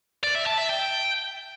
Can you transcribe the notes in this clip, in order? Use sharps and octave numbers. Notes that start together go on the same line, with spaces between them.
D5
E5
A5
E5
G5